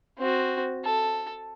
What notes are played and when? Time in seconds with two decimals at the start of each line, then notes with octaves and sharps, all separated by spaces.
0.19 C4 F#4
0.85 A4